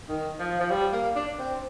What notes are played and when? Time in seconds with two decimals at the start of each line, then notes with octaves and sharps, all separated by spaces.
0.09 D#3
0.39 F3
0.61 F3
0.70 G3
0.93 A#3
1.16 D4
1.39 C4